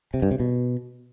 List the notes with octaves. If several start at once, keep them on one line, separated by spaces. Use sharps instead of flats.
C3
G2
C3
B2